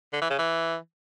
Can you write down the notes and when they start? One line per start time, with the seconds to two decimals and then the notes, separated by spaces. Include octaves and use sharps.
0.13 D3
0.22 E3
0.30 C#3
0.39 E3